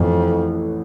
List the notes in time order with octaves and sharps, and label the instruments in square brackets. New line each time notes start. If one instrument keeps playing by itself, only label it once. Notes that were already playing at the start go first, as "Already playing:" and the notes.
Already playing: [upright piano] A1 A2 E3 [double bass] F2